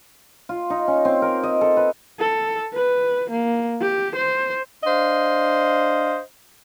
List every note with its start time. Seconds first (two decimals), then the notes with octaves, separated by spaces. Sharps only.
0.49 F4
0.70 D#4
0.88 C#4
1.05 C4
1.22 A#4
1.43 D#5
1.61 A4
1.77 B4
2.19 A4
2.74 B4
3.30 A#3
3.82 G4
4.16 C5
4.84 D4 C5 D#5 F5